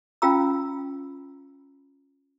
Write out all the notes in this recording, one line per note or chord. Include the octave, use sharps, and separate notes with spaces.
C#4 F4 F5 G5 A#5 E6